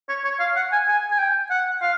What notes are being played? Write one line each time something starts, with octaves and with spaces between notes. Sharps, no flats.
C#5
C#5
F5
F#5
G#5
G#5
G#5
G5
F#5
F5